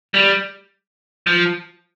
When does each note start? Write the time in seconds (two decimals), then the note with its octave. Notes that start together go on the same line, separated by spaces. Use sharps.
0.14 G3
1.27 F3